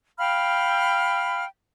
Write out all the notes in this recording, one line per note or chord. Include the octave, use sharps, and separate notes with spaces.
F5 G5 B5 F6